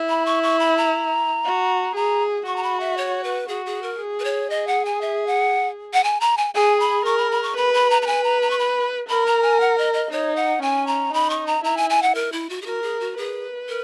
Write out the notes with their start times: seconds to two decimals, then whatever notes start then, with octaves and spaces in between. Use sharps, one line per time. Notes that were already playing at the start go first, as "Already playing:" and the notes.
Already playing: E4
0.09 B5
0.26 C#6
0.43 C#6
0.59 B5
0.77 A#5
1.45 F#4
1.95 G#4 A#5
2.46 F#4 C#6
2.56 A#5
2.63 B5
2.80 E5
2.97 C#5
3.24 B4
3.48 F#4 G#4
3.66 G#4
3.82 A#4
3.99 G#4
4.19 B4
4.24 C#5
4.50 G#4 D#5
4.67 F#5
4.85 G#5
5.01 E5
5.27 F#5
5.93 F#5
6.04 G#5
6.20 A#5
6.37 G#5
6.54 G#4 G#5
6.80 B5
7.05 A#4 C#6
7.18 B5
7.31 B5
7.43 C#6
7.56 B4 B5
7.74 B5
7.90 A#5
8.02 A#5
8.07 B4 G#5
8.24 A#5
8.42 A#5
8.50 C#6
8.59 B5
9.09 A#4 B5
9.26 A#5
9.42 G#5
9.60 F#5
9.78 D#5
9.93 D#5
10.11 D#4 C#5
10.36 F#5
10.62 C#4 G#5
10.87 A#5
11.13 D#4 B5
11.30 C#6
11.46 A#5
11.64 E4 A#5
11.77 G#5
11.90 G#5
12.02 F#5
12.15 A#4
12.32 E4
12.49 F#4
12.62 G#4
12.66 F#4 A#4
12.82 G#4
13.00 F#4
13.17 G#4 B4
13.68 A#4